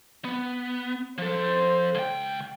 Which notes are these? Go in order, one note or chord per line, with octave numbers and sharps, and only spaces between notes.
B3
F3 A4 C5
C#2 G5